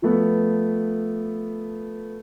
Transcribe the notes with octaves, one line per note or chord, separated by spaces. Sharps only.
F3 A3 B3